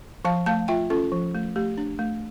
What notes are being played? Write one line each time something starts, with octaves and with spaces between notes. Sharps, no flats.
F3 F5 A5
A3 F5 A5
F4 E5 G5
C#4 F4 A4
F3
A3
A3 G4
D4
A3